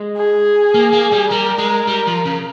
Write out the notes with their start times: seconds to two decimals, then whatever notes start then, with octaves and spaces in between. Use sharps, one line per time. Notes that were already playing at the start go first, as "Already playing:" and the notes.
Already playing: G#3
0.17 G#4
0.74 A#3
0.93 A#3
1.12 G3
1.31 G3 A#4
1.58 G#3
1.87 G3
2.07 F3
2.25 C#3